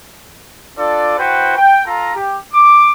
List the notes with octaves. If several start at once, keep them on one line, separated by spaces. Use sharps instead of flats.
D4 F4 A4 D5
E4 F#4 B4 C5 G5
G5
F4 A4 A#5
G4
D6